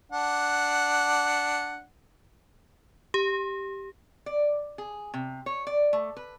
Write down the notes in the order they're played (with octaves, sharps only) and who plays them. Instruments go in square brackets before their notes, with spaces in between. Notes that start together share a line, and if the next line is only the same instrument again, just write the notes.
[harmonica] D4 F#5
[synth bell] G4
[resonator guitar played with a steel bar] D5
G#4
C3
C#5
D5
A3
B4